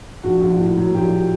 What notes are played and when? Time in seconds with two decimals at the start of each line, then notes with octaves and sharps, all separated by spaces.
0.23 A#1 F#4
0.41 A#1
0.59 A2
0.77 F#3
0.94 A#1 G4